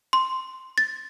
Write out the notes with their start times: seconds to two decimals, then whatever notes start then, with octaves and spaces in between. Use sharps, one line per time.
0.13 C6
0.78 A6